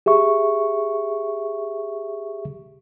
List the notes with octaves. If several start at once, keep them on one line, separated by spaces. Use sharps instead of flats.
G4 G#4 E5 C#6